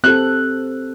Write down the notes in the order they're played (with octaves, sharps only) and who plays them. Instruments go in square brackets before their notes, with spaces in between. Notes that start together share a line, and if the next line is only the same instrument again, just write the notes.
[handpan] C4 G4 A4 [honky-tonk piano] F#6